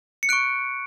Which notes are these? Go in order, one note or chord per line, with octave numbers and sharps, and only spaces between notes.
C#7
C#6 F#6 D7